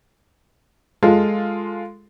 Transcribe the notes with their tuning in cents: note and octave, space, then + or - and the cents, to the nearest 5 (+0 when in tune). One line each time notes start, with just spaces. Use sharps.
G#3 +0 F4 +0 A4 +0